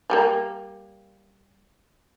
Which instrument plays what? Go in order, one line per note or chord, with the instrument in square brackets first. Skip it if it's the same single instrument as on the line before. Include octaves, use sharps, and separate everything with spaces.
[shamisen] F3 G3 A#3